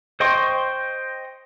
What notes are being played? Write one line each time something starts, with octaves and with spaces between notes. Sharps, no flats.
C5 D#5 G5 C6 C#6